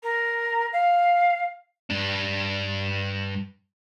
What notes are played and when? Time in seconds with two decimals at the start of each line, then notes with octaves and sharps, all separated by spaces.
0.03 A#4
0.72 F5
1.90 G2 D4